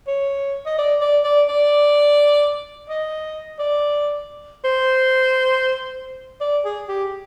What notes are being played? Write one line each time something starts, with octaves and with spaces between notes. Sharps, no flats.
C#5
D#5
D5
D5
D5
D5
D#5
D5
C5
D5
G#4
G4